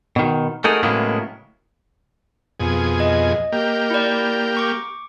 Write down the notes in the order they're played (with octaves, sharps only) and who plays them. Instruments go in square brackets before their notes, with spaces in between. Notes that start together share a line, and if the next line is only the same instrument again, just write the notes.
[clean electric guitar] B2 D#3
A3 D#4 F#4 G#4 A#4
A2 C#3 F#3 G#3 A#3 B3
[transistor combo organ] F2 B2 G#4
[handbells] D#5
[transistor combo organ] A#3 G4
[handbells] E4 D5
C#6 D6